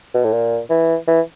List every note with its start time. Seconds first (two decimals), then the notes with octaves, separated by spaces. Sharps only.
0.14 B2
0.24 A2
0.33 A#2
0.70 E3
1.07 E3